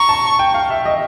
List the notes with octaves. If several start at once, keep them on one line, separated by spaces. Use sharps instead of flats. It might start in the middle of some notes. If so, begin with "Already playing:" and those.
Already playing: A#5 C#6
A5
G5
F5
E5
D#5